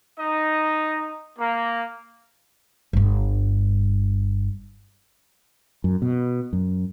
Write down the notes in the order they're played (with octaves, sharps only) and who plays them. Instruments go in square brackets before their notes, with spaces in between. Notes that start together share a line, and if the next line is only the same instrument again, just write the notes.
[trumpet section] D#4 D#5
A#3
[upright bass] G1 G2
[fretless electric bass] F#2
B2
F#2